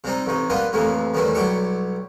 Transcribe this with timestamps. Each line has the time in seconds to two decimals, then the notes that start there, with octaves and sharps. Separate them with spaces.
0.04 C3 G3 C4 D#4
0.27 A1 C3 D#4
0.50 G3 A#3 B3 F4 B4 D#5
0.73 F2 A2 C3 E3 F3 A#3
1.14 E2 A2 D#3 E3 G3 E4
1.35 B1 F#3 G3 E4 G4 C#6